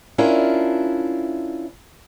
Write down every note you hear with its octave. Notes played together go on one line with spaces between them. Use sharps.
C#4 D4 E4 F4 A#4